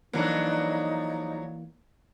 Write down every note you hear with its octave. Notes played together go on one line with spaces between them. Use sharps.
F2 E3 F#3 A#3 D4 D#4